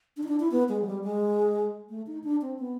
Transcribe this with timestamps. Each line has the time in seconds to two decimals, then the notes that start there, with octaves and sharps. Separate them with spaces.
0.17 D4
0.23 D#4
0.28 D4
0.40 E4
0.51 B3
0.69 G#3
0.82 F#3
0.87 G3
1.03 G#3
1.89 A3
2.07 D#4
2.24 D4
2.41 C4
2.59 B3